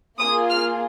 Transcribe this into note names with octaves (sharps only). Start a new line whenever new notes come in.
A#3 F4 G#4 D#6
F6